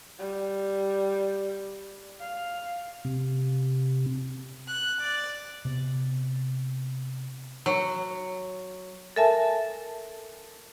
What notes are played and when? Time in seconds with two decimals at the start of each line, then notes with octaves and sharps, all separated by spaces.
0.19 G3
2.20 F5
3.05 C3
4.68 F#6
5.01 D5
5.65 C3 B3
7.66 F#3
9.16 A4 A#4 E5 G#5 A5